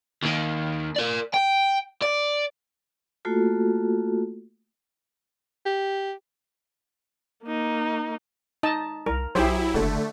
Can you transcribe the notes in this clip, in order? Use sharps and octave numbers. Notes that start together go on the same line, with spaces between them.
D#2 D#3
A#4 D5
G5
D5
A3 A#3 F4 F#4 A4
G4
A#3 D#4
D#4 D#5 A5
C2 A#4
B1 F#3 E4 G4 G#4 C5
F#1 D3 A3